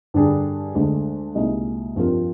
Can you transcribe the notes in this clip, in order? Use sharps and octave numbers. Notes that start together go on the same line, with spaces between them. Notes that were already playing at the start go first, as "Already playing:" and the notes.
G2 D3 G3 D4 G#4
D2 D3 G#3
C2 A#2 G#3 D#4
G2 F3 C4 F4 A#4